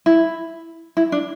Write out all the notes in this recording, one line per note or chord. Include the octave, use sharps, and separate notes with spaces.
E4
E4
D4